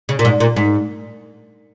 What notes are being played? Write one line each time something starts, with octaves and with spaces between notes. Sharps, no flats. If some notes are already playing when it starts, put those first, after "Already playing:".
C#3
A#2
G#2
A#2
G#2